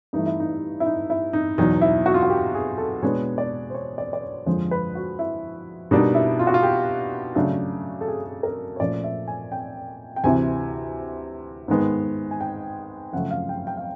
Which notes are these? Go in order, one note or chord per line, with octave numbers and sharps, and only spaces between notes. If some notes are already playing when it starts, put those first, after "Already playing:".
G2 E3 A3 D#4
E4
D#4
E4
D#4
E4
D#4
E2 B2 F#3 D#4
E4
F#4
F4
F#4
G4
G#4
A4
B2 G#3 B3 D4 C#5
D5
C5
C#5
D5
D5
C#5
F2 D3 F3 G#3 C5
B4
F#4
E4
B2 G3 A#3 D4 D#4
E4
F4
F#4
F4
G4
C#3 F#3 A3 D4
A4
G#4
G#4
A#4
C#5
A#2 F3 A3 C#4 D5
E5
G#5
G5
G5
D2 C3 E3 G#5
G#2 D#3 G#3 B3
G#5
G5
F#2 C#3 F3 A3 F#5
F5
G5
G5
F5